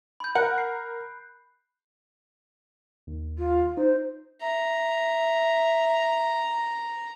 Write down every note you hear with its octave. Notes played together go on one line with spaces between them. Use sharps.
B5 G6
A#4 F#5 F#6
C7
D#2
F4
D#4 C5
E5 A#5